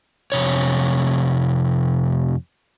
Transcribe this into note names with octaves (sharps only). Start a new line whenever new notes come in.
F2 C3 C#5